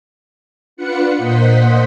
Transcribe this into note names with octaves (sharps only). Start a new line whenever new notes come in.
D4 F4 B4 F#5 C#7
A#2 A#3 C5 D#5 F#5 B6